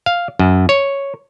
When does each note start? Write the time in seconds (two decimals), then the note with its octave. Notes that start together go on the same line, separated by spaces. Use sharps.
0.06 F5
0.39 F#2
0.69 C#5